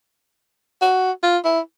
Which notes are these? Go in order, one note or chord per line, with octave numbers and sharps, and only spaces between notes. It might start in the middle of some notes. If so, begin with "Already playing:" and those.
F#4
F4
E4